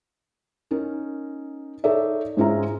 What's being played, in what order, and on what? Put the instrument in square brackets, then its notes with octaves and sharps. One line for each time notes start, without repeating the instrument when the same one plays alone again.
[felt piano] C#4 D#4 A#4
D#4 A4 C#5 D5 E5
G#2 G#3 C#4 F4 E5 A#5